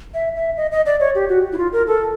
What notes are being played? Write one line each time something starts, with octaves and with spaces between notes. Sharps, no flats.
E5
E5
D#5
D#5
D5
C#5
G4
F#4
E4
F4
A#4
A4